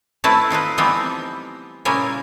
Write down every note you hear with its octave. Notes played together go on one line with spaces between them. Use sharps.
A3 C4 E4 B4 A5
C4 D#4 F4 B4
E3 F3 G3 B3 C4 D#4
A#2 C#3 G3 E4 A#4 G#5